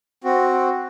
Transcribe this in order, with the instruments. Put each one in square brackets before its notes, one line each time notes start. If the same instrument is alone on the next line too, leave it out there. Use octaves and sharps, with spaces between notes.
[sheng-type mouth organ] C4 F#4